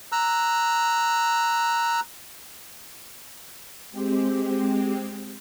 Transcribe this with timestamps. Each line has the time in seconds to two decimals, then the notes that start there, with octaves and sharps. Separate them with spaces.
0.12 A#5 E6 F#6
3.91 G#3 C4 G4